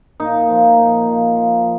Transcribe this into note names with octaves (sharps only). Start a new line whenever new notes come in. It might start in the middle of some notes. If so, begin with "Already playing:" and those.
A#2 D#4
F3
A#2
F3
F3